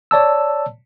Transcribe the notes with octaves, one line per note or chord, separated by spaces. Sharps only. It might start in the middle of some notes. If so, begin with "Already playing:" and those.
C#5 D5 A5 E6